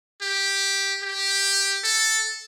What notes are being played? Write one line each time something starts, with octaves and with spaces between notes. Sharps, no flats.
G4
G4
A4